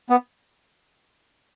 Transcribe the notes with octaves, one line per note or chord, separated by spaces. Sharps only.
B3